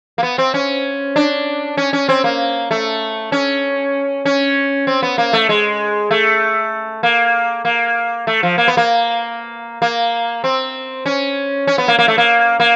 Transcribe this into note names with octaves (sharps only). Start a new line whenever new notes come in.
A#3
B3
C4
C#4
D4
C#4
C#4
C4
A#3
A3
C#4
C#4
C4
B3
A#3
A3
G#3
A3
A#3
A#3
A3
F3
A#3
B3
A#3
A#3
C4
C#4
C#4
B3
A#3
A#3
A3
A#3
A#3